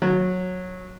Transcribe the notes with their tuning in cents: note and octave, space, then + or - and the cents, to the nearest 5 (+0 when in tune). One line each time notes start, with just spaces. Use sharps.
F#3 -15